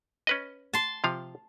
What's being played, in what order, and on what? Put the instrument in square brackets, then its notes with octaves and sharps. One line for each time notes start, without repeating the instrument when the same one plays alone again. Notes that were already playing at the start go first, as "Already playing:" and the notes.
[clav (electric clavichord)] C#4 B4 D#5
[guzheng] A5 C6
[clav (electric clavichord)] C3 F3 F5